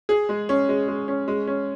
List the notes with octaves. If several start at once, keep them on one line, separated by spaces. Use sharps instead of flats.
G#4
G#3
C#4
G#3
G#3
C#4
G#3
C#4